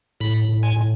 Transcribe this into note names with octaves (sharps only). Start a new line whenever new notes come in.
A2 B5
A2
G#5
A2